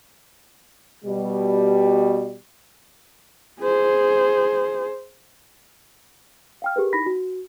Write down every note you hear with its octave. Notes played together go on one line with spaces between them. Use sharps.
B2 G3
G#4 C5
F5 G5 F6
G4 G#4 A#4 B4
D#4 E4 B5 A#6 B6
F#4